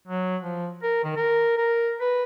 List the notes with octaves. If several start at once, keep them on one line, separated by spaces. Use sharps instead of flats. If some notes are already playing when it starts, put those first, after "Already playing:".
F#3
F3
A#4
D#3
A#4
A#4
B4